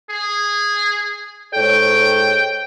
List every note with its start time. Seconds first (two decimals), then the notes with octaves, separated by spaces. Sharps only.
0.10 G#4
1.54 G#2 A4 C#5 G5